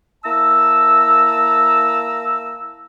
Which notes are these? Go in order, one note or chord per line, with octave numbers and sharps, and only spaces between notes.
A#3 E4 A5 A#5 E6